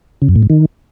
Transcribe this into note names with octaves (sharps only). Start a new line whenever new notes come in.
C#3
F#2
A2
G#2
D#3